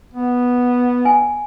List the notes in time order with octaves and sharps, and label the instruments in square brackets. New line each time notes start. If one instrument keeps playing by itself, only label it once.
[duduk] B3
[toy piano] G#5